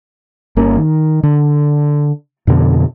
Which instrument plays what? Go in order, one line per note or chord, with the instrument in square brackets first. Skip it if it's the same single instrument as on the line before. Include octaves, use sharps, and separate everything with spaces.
[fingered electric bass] G1 A#3 C#4
D#3
D3
F2 B2 D3